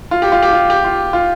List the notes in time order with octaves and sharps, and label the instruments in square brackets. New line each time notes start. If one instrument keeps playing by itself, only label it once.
[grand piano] F4
G4
F4
G4
F4
G4
F4
F4